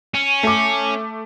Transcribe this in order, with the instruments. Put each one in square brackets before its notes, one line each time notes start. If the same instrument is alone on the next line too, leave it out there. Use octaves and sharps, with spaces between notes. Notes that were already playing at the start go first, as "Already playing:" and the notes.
[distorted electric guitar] C#4
[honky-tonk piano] A3 D6